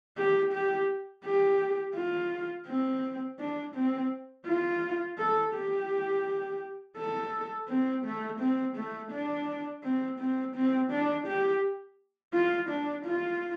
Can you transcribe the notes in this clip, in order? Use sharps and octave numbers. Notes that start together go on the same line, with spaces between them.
G4
G4
G4
F4
C4
D4
C4
F4
A4
G4
A4
C4
A3
C4
A3
D4
C4
C4
C4
D4
G4
F4
D4
F4